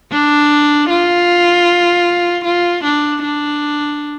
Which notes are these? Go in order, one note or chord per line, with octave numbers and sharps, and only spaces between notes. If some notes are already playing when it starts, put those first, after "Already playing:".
D4
F4
F4
D4
D4